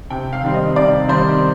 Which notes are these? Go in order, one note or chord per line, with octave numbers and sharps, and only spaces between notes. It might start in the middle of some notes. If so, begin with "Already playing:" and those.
C3 G5
F5
D#3 G3 C4
D#5
C3 D5
D#3 G3 C4 C5